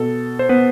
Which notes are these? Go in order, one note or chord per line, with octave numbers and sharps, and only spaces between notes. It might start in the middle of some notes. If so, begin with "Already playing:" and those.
Already playing: B2 A4
C5
B3 B4